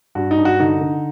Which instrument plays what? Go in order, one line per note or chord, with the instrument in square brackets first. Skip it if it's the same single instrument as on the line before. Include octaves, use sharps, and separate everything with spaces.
[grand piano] G2 F#4
D#4
G2
F#4
D3 D#4
D3